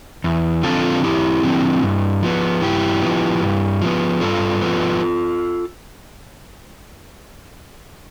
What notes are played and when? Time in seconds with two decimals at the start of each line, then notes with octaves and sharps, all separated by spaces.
0.24 E2
0.63 D3 F3 C4 F4 A4
1.03 E2 E4 G4
1.43 D3 F3 C4
1.83 G2
2.22 F3 B3
2.62 G2 E4 G4
3.02 F3 B3
3.42 G2
3.82 F3 B3
4.21 G2 F4 A4
4.61 F3 B3